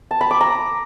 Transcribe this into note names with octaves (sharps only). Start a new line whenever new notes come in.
A5
B5
D6
A#5